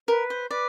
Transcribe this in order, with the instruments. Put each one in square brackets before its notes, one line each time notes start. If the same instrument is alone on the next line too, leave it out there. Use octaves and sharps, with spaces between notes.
[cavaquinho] A#4 [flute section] B4
[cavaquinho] C5
[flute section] B4 [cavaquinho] D5